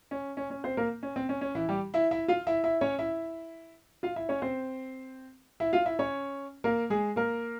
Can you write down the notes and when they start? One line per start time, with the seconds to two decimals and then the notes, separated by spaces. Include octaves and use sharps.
0.11 C#4
0.37 C#4
0.50 C#4
0.64 C4 C5
0.77 A#3 A#4
1.03 C#4
1.16 C4
1.29 C#4
1.41 C#4
1.55 E3 E4
1.69 G3 G4
1.94 E4 E5
2.11 E4 E5
2.28 F4 F5
2.47 E4 E5
2.64 E4 E5
2.81 C#4 C#5
2.99 E4 E5
4.03 F4 F5
4.16 E4 E5
4.29 C#4 C#5
4.42 C4 C5
5.60 E4 E5
5.73 F4 F5
5.85 E4 E5
5.99 C#4 C#5
6.64 A#3 A#4
6.90 G#3 G#4
7.16 A#3 A#4